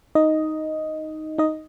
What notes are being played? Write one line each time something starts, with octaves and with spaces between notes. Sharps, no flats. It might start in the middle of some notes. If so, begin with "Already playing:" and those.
D#4 D#5
D#4 D#5